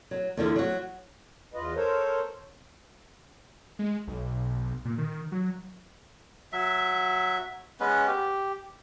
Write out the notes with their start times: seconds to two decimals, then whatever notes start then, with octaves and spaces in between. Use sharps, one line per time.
0.11 F#3
0.37 E2 D3 F3
0.56 F#3 F#4
1.54 E2 F4 B4 D#5
1.76 A4 A#4 C5 C#5
3.79 G#3
4.08 B1
4.85 A#2
4.98 D#3
5.32 F#3
6.53 F#3 E5
7.80 G#3 B3 C#4 B4
8.07 G4